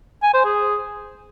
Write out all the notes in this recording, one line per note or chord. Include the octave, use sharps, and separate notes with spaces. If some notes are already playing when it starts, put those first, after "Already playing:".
G#5
C5
G#4